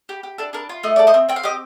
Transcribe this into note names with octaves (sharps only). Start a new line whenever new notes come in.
G4
G4
D4 A4
D4 A#4
F4
A3 D#5
A4 D5
C5 D#5
C4
C4 G5
F5
G4 D#5